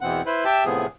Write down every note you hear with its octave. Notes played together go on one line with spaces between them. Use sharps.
E2 B2 E3 C4 F#5
E4 B4 C5
G4 E5 G5 A5
A2 C3 F3 B3 G#4